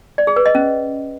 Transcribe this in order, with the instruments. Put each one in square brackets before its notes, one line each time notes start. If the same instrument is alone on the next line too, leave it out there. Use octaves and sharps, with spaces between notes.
[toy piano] D5
G#4
B4
D#5
C#4